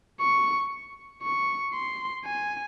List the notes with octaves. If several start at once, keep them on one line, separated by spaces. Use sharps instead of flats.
C#6
C#6
C6
G#5